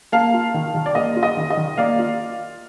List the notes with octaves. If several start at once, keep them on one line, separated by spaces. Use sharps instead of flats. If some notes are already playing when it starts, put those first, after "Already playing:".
A#3 F5 A5
F4
D#3
D#3
D5
A#3 D#5
F4
D#5
D#3
D#5
D#3
A#3 D5 F5
F4